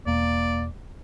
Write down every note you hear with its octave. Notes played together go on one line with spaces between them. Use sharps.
E1 A#3 D5